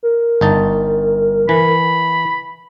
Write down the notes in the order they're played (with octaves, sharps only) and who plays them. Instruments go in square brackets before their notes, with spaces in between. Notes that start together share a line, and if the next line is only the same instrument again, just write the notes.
[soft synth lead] A#4
[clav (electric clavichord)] G1 D#4 A5
[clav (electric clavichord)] E3 [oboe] B5